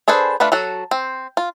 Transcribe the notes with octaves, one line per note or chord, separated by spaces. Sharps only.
D4 G#4 A4 B4 C5
A3 D4 F4 B4
F#3 F#4 A4
C4
F4